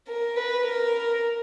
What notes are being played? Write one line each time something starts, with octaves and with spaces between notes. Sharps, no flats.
A#4
B4
A#4